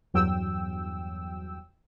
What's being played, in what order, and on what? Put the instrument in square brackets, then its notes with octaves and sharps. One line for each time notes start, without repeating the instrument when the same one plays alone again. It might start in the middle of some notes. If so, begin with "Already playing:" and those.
[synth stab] E2 G2 F#3 G5 E6